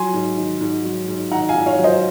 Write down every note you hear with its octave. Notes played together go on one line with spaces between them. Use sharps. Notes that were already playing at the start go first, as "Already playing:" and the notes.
Already playing: F#3 G#5 C6
G#2
D#3
G#2
F#3
G#2
D#3 F#5 A#5
F5 G#5
G#2
C#5 F5
F#3
C5 D#5